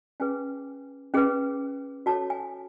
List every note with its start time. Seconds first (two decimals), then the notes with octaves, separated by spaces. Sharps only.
0.20 C#4 G#4 B4 G#5
1.14 C#4 G#4 B4
2.06 F#4 A4 C#5 A5
2.30 G#5